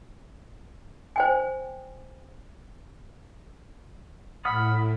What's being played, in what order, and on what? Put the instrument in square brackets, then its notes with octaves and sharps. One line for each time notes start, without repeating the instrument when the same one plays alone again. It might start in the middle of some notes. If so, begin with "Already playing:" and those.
[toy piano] C5 G5 G#5
[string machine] A2 [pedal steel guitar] F#5 D#6 F6 [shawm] B5